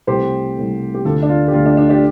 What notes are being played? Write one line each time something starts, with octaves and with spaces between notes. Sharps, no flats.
C2 C3 A3 G4 C5
C2 C3 A3
G4
D2 D3 A3 F4 A4
D4
F4
G4
D2 D3 A3 F4
D4
D4
D4 G4